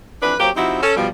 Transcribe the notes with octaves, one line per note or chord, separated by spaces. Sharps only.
F2 E3 D4 B4
F#3 A#3 C4 G4
F3 C4 D#4 E4 F#4 G4
C#4 A4
B2 F3 G3